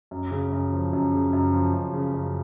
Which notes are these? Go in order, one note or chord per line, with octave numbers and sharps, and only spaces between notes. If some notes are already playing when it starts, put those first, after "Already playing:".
F#2
C#3
F#2
F3
F#2
C#3
F#2
F3
F#2
C#3
F#2